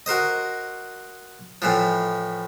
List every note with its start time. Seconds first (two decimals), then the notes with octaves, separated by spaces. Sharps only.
0.06 F#4 A#4 C5 D#5
1.62 A2 E3 F3